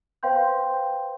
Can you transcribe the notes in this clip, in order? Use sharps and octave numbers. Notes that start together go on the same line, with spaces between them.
B4 C5 F5 G5 C6 G6